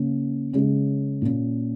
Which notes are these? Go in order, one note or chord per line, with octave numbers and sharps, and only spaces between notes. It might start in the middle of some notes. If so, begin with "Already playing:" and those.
Already playing: C#3 A#3 C#4
C#3 G#3 C#4
A#2 A#3 C#4